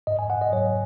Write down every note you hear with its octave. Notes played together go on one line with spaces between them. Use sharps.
G#2 D#5
G#5
G#2 F#5
D#5
F#3 C#5